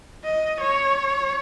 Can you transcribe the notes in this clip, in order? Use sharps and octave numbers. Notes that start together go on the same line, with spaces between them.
D#5
C#5